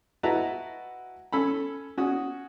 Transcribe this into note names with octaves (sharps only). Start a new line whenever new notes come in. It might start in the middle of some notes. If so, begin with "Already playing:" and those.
E4 F#4 B4 D#5 A5 A#5
C#4 A4 B5
C#4 F#4 D#6